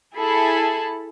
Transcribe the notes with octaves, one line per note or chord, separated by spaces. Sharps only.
E4 G#4 A4 A5 B5